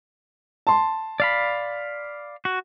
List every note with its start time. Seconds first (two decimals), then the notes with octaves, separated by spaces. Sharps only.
0.67 A5 C6
1.20 D5 F5 B5
2.45 F#4